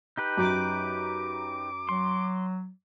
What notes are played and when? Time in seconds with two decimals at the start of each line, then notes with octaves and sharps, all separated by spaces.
0.17 D#4 G4 B4
0.37 F#2 D6
1.89 F#3 C6